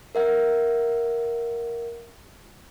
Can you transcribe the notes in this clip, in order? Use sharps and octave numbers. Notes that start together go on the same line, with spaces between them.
A#4 E5 F#5